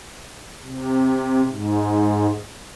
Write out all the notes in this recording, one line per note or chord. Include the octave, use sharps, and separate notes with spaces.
C3
G#2